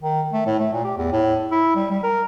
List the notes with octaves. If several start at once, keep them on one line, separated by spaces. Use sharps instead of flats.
D#3
A3
A2
A3
A#2
G4
E2
A2
E4
G3
G3
A#4